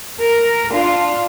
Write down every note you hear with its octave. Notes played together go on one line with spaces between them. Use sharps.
A#4
D4 F4